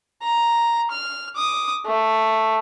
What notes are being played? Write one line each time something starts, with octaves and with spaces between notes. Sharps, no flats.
A#5
F6
D6 D#6
A3